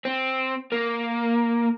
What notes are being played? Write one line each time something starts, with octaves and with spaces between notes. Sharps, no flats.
C4
A#3